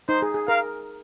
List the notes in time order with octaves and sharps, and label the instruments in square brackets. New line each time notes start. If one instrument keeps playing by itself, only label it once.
[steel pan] D#4 [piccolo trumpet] C5
[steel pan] G#4
G#4
[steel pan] A#4 [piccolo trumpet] F5